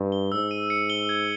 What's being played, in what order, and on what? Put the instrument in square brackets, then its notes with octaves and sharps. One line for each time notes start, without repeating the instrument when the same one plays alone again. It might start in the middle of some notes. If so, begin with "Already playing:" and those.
Already playing: [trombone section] G2
[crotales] G7
[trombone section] G#2 [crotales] E6
[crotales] D#7
C#7
G7
G#6